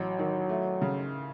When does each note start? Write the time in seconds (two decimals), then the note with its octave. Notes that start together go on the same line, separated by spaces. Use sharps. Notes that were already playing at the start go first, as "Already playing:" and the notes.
Already playing: A1 F#3
0.19 D#3
0.49 A3
0.82 C#3